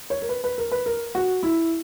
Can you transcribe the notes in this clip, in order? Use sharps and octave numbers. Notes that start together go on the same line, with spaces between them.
C#5
A#4
B4
B4
A#4
B4
A#4
F#4
E4